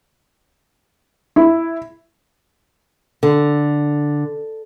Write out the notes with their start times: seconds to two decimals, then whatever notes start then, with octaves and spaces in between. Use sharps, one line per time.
1.36 E4
3.23 D3